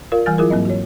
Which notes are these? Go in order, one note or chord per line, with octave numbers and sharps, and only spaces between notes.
F4 A#4 D5 F5
E3 G3 G#5 F6 A6
F#3 E4 F4 G#4 A#4
G#2 F#3 A#3 C4 D#5
F#4 C#5